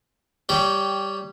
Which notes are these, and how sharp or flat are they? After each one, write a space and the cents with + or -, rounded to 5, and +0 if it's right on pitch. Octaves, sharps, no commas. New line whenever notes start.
G3 +0 C#5 +20 G5 -5